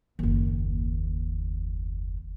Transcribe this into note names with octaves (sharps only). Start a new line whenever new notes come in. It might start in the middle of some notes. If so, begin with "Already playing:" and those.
F#1 D#2